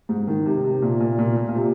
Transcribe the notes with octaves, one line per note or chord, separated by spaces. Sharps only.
G#2
D#3
C3
C3
A#2
A#2
A#2
A#2
A#2
C3